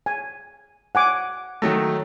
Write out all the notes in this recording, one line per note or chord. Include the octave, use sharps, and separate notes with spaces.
G#5
F#5 G#5 D6
D#3 F#3 A3